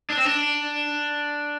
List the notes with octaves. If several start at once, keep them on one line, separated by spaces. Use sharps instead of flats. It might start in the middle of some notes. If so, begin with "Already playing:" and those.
D4
C4
D4